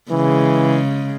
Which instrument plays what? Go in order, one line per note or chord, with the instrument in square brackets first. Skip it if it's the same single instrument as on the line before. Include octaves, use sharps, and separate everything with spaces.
[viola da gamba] C#3 G#3 [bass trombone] E3